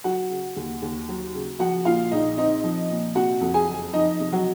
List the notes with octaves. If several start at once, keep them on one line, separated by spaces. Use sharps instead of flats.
F#3 F#4 F#5
C#3
D#2
D#2
F#3
C#3
F3 F#4 F#5
A#2 F4 F5
A#1 D#4 D#5
C4 D#4 D#5
F3
A#2
C3 F#4 F#5
F2
G#4 G#5
F#1
F3 D#4 D#5
C3
F#3 F#4